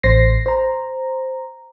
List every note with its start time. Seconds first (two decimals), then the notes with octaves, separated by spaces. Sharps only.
0.03 A1 C5 A#6 C7
0.46 C5 A#5